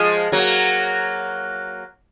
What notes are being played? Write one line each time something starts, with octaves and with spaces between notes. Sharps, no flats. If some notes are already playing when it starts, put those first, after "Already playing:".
Already playing: F3 G#3
F#3 A#3